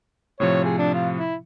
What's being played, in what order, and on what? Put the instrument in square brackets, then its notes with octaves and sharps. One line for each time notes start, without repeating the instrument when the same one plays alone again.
[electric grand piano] A2 C3 F3 [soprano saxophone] C#5
[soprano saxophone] G#4
D4
F4
E4